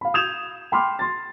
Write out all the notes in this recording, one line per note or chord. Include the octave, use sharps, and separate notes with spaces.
F5 B5
D#6 G6 G#6 E7 F7
G5 B5 C6 D6 F6
C6 A6